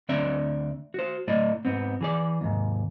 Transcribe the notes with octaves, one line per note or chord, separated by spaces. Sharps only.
D2 C4 D4 D5 E5
F#4 C5
A2 A3 D5 D#5
G#2 B3 C4
E3 G#4 D5
D#2 G#2